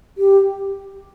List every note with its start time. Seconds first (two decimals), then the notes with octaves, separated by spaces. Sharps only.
0.18 G4